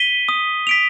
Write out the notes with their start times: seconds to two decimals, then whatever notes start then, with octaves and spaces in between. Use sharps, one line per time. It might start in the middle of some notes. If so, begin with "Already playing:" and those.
Already playing: B6 D#7 G7
0.29 D#6
0.67 B6 D7 F7